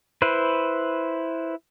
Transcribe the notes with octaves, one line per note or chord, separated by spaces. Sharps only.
E4 B4 C5